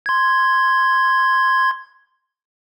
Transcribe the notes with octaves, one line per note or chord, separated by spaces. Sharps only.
C6 G#6